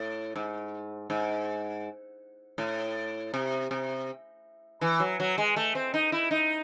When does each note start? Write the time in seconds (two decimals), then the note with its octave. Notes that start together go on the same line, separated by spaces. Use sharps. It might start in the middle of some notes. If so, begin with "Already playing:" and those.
Already playing: A2
0.36 G#2
1.10 G#2
2.58 A2
3.34 C3
3.71 C3
4.81 E3
5.00 F#3
5.20 F#3
5.38 G#3
5.56 A3
5.75 C4
5.94 D#4
6.12 E4
6.31 D#4